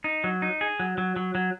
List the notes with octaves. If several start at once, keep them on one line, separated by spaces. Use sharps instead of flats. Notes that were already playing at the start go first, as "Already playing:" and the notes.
D#4
F#3
D#4
G#4
F#3
F#3
F#3
F#3